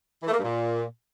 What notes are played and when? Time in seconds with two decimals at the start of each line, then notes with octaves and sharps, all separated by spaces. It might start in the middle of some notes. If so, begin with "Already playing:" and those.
0.23 E3
0.28 A3
0.33 A#3
0.38 G2
0.44 A#2